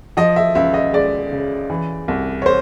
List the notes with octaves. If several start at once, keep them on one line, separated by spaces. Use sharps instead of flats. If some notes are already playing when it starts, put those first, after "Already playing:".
F3 D#5
E5
C#2 E5
D#5
G#3 D5
C#3
E3
C2
C#5
C5